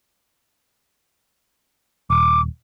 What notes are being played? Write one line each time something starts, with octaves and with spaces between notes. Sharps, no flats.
D#1 D6